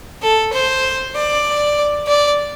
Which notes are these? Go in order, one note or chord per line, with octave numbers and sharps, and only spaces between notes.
A4
C5
D5
D5